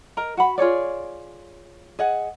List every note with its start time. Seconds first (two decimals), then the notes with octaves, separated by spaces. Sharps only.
0.17 A#4 D#5 A#5
0.37 F#4 F#5 B5
0.58 F4 G#4 C#5 D5
1.99 G#4 D#5 F#5